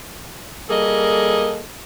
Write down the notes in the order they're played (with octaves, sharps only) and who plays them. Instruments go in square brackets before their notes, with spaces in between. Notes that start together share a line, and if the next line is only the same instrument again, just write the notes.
[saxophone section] G3 A#3 G#4 A4 D#5